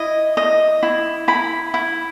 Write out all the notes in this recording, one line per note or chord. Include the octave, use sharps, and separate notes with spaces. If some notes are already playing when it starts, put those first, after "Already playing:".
Already playing: E4 D#5
D#5
E4
E4 B5
E4